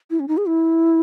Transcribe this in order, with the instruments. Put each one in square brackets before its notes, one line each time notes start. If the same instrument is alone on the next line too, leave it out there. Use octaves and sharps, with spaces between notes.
[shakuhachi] E4
C#4
D#4
G#4
E4